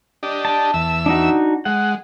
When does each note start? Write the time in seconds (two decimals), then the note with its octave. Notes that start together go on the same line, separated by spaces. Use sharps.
0.23 D4 G4 D#5
0.45 A5
0.74 E2 E5 E6
1.06 D4 D#4 F#4
1.65 G#3 F#5